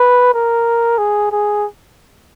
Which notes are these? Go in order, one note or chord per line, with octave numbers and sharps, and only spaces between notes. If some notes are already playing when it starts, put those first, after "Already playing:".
Already playing: B4
A#4
G#4
G#4